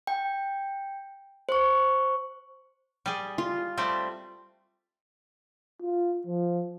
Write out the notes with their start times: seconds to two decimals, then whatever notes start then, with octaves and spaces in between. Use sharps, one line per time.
0.07 G5
1.49 C5 C#6
3.06 G3 G#4
3.38 F4
3.78 G3 A3 C4
5.82 F4
6.26 F3